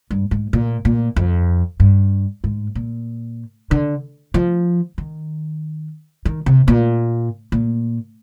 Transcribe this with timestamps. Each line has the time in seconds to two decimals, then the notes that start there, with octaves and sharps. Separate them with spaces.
0.11 G2
0.31 G#2
0.53 A#2
0.85 A#2
1.16 F2
1.80 G2
2.44 G#2
2.75 A#2
3.71 D3
4.34 F3
4.98 D#3
6.25 D#3
6.46 C3
6.68 A#2
7.52 A#2